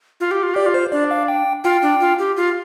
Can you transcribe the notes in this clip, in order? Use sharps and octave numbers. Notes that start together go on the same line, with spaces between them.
F4
G4
F4
G4 D5
F4
C5
D4 D5
F5
G5
F4 G5
D4
F4
G4
F4